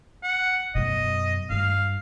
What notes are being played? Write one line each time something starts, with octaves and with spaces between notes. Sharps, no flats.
F#5
F#2 B2 D#5
G2 G3 F5